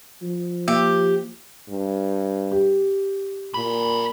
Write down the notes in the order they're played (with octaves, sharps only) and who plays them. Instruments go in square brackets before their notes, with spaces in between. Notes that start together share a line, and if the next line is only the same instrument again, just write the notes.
[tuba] F3
[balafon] A#3 [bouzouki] G4
[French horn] G2
[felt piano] G4
[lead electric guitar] F#2 B5 [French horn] A#2